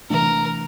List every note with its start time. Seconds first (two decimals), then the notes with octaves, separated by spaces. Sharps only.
0.10 C3 E3 A3 D4 A#4